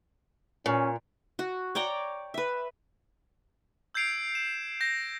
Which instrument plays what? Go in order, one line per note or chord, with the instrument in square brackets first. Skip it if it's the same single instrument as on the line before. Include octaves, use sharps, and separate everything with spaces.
[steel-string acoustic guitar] A#2 [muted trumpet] C#4
[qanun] F#4
C#5 D5 G5 A#5
B4 E5
[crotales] E6 G6 G#6 C7 D7 F7
E7
G6 A#6